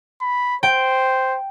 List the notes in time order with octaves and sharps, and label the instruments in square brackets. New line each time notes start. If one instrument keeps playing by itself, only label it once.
[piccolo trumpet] B5
[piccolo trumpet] C5 [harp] G5